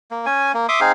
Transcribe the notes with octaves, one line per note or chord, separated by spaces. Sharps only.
A#3
C#4 G#5
A#3
E5 C6 D6 D#6
C4 D#4 G#4 F5